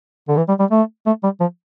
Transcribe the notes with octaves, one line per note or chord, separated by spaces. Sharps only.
D3
E3
G3
G3
A3
A3
G3
F3